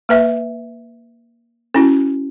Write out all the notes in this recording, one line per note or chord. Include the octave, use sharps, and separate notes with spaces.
A#3 B4 E5
C#4 E4 F#4